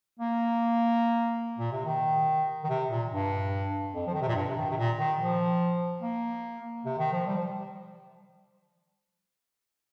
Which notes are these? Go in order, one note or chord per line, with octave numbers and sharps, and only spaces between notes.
A#3
A#2
C3
D#3
D#3
C3
A#2
G2
F2
F3
D#3
C3
A#2
G2
C3
D#3
C3
A#2
D#3
F3
A#3
C3
D#3
F3
G3
F3